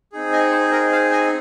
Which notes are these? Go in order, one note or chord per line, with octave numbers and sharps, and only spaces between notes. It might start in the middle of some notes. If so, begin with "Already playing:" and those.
C4 D#4 G#4
D#5 G#5
C5
A#4 D#5
C5 F5
D#5 G#5